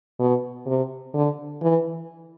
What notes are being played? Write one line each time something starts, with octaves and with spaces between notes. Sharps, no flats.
B2
C3
D3
E3